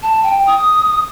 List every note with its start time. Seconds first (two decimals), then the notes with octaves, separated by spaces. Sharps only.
0.03 A5
0.23 G5
0.47 D#6